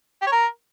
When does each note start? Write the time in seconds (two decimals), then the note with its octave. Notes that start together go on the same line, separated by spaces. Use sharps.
0.22 G4
0.27 C#5
0.32 A#4